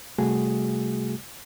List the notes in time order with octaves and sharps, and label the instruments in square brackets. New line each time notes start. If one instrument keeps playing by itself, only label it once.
[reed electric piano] C3 G3 A3 F#4 G#4